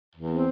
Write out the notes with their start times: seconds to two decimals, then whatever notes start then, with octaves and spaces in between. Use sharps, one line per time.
0.16 E2
0.31 C4